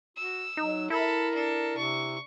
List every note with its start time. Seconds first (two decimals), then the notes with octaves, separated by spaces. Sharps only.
0.17 F#4 E6
0.57 F#3 D#4
0.90 E4 A4 A#4 B5
1.34 D4 A4
1.77 C3 C#6